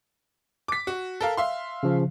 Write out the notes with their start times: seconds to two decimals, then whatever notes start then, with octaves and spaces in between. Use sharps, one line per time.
0.68 D6 B6
0.87 F#4
1.21 A4 A#4 F5
1.37 E5 F5 C6
1.83 C#3 F3